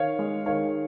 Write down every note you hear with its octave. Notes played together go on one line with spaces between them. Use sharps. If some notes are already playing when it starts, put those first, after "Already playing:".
Already playing: D#3 C#5 F5
G#3
D#3 C#5 F5